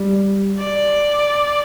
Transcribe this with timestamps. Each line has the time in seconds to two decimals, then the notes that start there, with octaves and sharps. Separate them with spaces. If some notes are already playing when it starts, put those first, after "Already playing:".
Already playing: G3
0.58 D5